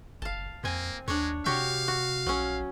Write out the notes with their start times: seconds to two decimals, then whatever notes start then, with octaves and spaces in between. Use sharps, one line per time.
0.22 F#1 F5 A5
0.64 F2 A#3 C4 G#5
1.08 D#2 G#3 D4 C#5
1.46 C3 F#4 G4 C#5 F5
1.88 F#4
2.26 A#1 F#3 C#4